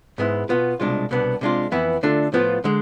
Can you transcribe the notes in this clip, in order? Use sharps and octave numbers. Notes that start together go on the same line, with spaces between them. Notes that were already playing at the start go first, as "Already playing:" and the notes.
G#2 G#3 B3 E4
B2 B3 F4
C2 B2 G#3 D4 F4
C2 B2 B3 D4
C3 G#3 D4 F4
F2 E3 B3 E4
D3 A3 D4 F4
A2 F3 B3 F4
D3 G#3